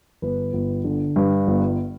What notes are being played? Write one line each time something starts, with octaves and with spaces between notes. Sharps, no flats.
G1 B4
G1
D3
G2
G1